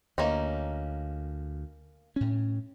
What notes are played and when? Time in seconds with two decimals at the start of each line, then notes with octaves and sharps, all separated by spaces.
0.18 D2 A#3 C#4 D#4
2.16 A2 C#4